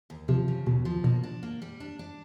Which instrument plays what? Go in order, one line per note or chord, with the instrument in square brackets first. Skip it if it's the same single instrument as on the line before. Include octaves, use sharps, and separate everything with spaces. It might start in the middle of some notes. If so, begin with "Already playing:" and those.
[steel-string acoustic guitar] D#2
[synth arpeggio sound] C3 [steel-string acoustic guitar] F3
[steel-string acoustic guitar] C#3
[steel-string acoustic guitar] D#2 [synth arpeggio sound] B2
[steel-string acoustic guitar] F3
[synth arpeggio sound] B2 [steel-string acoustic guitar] A#3
[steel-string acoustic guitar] D4
A#3
G3
D4
D4